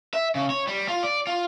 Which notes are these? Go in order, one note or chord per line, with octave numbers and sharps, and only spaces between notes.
E5
C#3
C#5
G3
F4
D5
F4